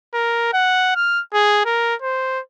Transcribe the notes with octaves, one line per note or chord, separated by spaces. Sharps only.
A#4
F#5
F6
G#4
A#4
C5